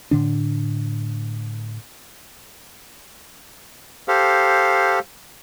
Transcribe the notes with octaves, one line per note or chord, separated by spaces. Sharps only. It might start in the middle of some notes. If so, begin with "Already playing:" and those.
A2 D3 D4
G4 A4 C5 F5